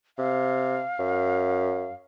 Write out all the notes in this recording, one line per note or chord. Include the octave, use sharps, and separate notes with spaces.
C3 F5
F#2